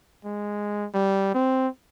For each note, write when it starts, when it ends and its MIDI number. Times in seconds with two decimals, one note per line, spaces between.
0.25 0.87 56
0.94 1.33 55
1.35 1.68 60